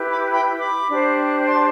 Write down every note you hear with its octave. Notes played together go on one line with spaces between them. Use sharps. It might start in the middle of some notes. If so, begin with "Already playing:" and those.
Already playing: E4 G4 B4
B5 D6
G5 B5
B5 D6
D4 G4 C5
A5 C6